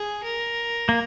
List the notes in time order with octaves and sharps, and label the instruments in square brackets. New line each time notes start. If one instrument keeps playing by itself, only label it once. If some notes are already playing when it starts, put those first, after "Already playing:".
Already playing: [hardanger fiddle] G#4
A#4
[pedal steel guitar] A#3